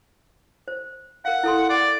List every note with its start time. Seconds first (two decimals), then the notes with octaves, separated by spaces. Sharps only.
0.68 C5
1.25 A#4 F5 F#5
1.43 E4 A4 C6
1.70 D5 F#5